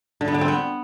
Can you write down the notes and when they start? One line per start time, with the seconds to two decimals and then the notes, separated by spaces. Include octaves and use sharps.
0.21 D3
0.28 B3
0.34 D3
0.41 C4
0.48 B3